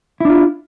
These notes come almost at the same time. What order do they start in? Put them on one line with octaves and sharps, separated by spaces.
E4 D4 F4